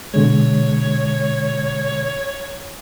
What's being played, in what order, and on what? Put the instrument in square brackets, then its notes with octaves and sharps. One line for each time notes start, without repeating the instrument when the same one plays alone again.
[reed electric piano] B2 D3 G#3 [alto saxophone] C#5